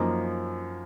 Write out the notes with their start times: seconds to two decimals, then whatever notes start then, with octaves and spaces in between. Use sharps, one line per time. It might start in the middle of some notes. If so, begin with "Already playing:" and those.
Already playing: F#2 F3 A#3 D#4